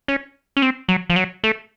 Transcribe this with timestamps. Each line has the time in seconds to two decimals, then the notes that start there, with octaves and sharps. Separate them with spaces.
0.08 C#4
0.57 C#4
0.62 C4
0.88 F#3
1.10 F3
1.16 F#3
1.44 A3